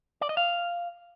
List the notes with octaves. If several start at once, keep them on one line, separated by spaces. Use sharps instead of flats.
D5
D#5
F5